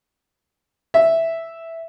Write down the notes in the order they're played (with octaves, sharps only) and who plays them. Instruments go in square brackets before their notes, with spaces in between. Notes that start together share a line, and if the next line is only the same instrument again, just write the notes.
[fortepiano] E5